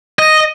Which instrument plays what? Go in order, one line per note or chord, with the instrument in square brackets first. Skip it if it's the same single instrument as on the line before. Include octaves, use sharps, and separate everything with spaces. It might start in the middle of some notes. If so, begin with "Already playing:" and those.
[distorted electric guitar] D#5